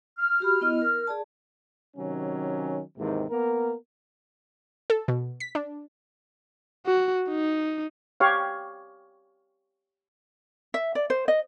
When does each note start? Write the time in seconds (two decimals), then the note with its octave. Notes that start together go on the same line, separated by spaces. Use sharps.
0.19 F6
0.40 F#4 G4 B5
0.61 B3 E4 D#5
0.82 A#4
1.07 G#4 D5 A5
1.96 C3 D#3 F#3 C#4
2.98 D#2 G#2 C3 D#3 E3
3.29 A#3 B3 A#4
4.90 A4
5.08 B2
5.40 B6
5.55 D4
6.86 F#4
7.29 D#4
8.20 G4 C#5 F5
10.74 E5
10.95 D5
11.10 C5
11.28 D#5